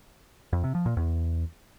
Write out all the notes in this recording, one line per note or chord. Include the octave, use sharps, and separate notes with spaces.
F2
C3
F3
A#2
E2